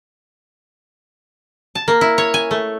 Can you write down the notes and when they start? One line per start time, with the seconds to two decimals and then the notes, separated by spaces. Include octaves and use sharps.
1.75 A5
1.88 A#3
2.01 E4
2.18 C#5
2.34 G#5
2.51 A3